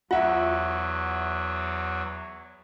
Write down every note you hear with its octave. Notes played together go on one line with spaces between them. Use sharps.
E2 F#3 F4 E5 F#5